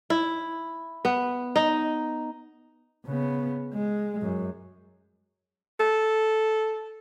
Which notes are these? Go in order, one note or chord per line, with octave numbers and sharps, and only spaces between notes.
E4
B3
D#4
C#3 B3
G#3
F#2
A4